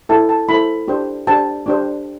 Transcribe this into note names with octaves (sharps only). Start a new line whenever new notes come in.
E4 A4 C5 A5
A5
E4 A4 C5 B5
D4 G4 C5
D4 G4 C5 A5
D4 G4 C5